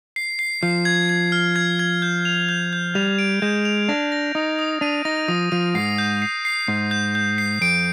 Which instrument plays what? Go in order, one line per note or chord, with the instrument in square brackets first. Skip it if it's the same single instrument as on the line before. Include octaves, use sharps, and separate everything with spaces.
[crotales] C7
C7
[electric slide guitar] F3 [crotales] C7
[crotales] G#6
G#6
F6
G#6
G#6
G6
F7
G6
G6
[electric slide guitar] G3 [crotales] F7
[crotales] D7
[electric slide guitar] G#3 [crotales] G6
[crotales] F7
[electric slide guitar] D4 [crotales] A#6
[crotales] A#6
[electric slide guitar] D#4 [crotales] D#6
[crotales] D#6
[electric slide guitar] D4 [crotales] D#7
[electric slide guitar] D#4 [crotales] A#6
[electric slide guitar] F3 [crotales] D#6
[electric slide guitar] F3 [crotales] D#7
[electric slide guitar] G#2 [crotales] C7
[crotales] G6
C7
C7
[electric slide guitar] G#2 [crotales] C7
[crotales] G6
G6
C7
[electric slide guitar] F2 [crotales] D7